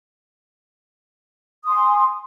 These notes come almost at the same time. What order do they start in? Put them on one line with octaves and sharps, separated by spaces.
D#6 C6 G#5